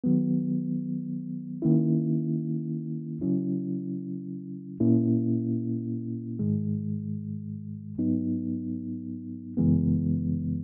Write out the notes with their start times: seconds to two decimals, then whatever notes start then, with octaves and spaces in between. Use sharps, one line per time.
0.04 D#3 F#3 B3
1.62 D#3 A#3 C#4 E4
3.21 C#3 F#3 C#4 E4
4.80 A#2 A#3 C#4 E4
6.39 G#2 D#3 G#3
7.98 G#2 F#3 B3 D#4
9.57 F#2 C#3 E3 G#3 B3